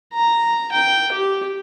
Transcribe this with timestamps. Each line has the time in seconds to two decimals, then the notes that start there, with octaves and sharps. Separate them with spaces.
0.13 A#5
0.72 G5
1.12 G4